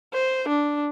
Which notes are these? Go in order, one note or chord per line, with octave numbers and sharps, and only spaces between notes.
C5
D4